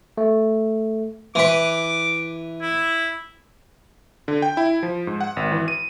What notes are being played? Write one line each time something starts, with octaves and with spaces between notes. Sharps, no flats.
A3
E3 B4 D6
E4
D3
G5
E4
F3
G#2
F#5
G#1
E3
D#7